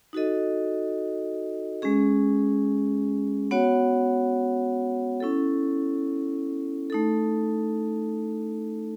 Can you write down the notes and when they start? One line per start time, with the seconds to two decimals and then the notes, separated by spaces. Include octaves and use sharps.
0.13 D#4 F#4 A4 D#5
1.82 G#3 C#4 G#4
3.51 B3 F#4 C#5 F#5
5.20 C#4 E4 A4
6.90 A3 D#4 A4